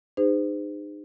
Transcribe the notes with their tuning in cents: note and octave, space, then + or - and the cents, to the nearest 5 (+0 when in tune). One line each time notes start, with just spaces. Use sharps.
D#4 -30 G#4 -40 C5 -35